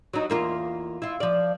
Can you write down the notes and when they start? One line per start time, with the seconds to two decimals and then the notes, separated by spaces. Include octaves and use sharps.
0.14 F#3 D#4
0.30 E2 A#3 F4
1.02 E4 F4
1.20 F3 D5